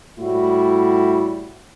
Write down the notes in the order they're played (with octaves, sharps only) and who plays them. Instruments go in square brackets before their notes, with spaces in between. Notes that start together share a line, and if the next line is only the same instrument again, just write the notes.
[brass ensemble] A2 G3 E4 F#4